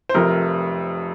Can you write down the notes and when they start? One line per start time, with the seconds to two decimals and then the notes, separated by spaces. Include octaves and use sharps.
0.09 C5
0.14 F1 F2 C3 A#4